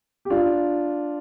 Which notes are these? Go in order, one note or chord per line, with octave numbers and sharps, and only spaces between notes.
G4
D4 F4